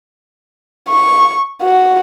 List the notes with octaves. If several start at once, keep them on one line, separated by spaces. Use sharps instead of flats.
C#6
F#4